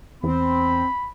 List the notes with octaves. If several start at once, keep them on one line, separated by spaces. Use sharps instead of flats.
E2 C4 B5